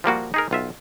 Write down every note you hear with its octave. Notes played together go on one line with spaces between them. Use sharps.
F3 G3 A#3 F#4
D#4 G#4 A#4
B1 F4 E5